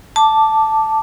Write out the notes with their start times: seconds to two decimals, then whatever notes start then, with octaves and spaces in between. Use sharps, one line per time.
0.16 A5 D6